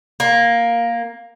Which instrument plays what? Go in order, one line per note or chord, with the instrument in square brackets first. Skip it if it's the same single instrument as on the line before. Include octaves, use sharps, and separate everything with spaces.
[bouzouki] A#3